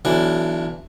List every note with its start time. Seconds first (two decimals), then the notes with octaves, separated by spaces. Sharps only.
0.05 B1 E3 D4